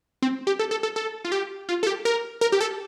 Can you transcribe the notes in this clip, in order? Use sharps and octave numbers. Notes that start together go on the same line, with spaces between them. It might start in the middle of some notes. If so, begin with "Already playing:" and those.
C4
G4
A4
A4
A4
A4
F4
G4
F4
A4
G4
A#4
A#4
G4
A4